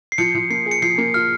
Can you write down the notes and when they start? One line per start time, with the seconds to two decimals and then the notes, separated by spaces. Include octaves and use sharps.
0.12 C7
0.18 F3 C#7
0.35 F3
0.50 A#3 C7
0.66 G#4
0.71 C#7
0.82 F3 C7
0.98 A#3
1.14 F4 F6